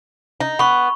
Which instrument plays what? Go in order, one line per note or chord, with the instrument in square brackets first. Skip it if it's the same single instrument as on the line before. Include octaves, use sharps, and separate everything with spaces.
[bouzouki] D#4
[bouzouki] B3 [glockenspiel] B5 C#6